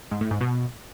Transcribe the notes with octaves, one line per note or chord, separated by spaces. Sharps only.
G#2
A2
G#2
B2